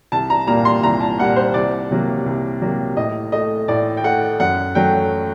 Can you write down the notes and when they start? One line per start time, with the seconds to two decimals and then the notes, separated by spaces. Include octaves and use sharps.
0.12 C2 A5
0.30 A#5
0.47 A#2 G3 A#3 A#5
0.65 C6
0.83 C2 A#5
1.01 A5
1.18 A#2 G3 A#3 F#5
1.36 C5
1.54 C2 D5
1.91 C3 F#3 A#3
2.26 C2
2.62 C3 F#3 A#3
2.97 A2 D#5
3.32 A3 D#5
3.68 A2 D5
3.97 G5
4.04 A3 F#5
4.40 F#2 F#5
4.75 F#3 A3 G5